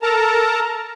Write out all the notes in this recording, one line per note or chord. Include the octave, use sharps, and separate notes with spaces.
A4 A#4 A5 A#5